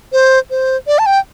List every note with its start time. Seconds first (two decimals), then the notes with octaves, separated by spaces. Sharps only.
0.13 C5
0.50 C5
0.87 D5
0.99 A5
1.06 G5